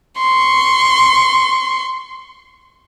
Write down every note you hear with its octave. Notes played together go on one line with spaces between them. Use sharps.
C6 C#6